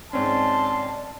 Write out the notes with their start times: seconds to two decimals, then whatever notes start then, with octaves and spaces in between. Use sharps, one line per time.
0.13 G#2 C4 C#4 D5 A5 C6